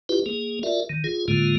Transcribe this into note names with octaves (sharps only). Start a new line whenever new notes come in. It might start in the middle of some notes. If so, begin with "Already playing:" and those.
E4 F4 G4 B4
A#3 G#4
F4 F#4 A#4 D5 E5
D#3
F4 G#4
A2 D3 G#3 A#3 F4